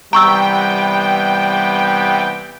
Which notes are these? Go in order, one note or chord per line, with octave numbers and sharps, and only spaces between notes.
C3 E3 G3 B3 G5 A#5 C#6 E6